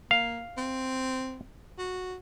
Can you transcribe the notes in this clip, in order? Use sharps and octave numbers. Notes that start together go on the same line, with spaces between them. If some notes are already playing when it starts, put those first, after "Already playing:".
A#3 F5
C4
F#4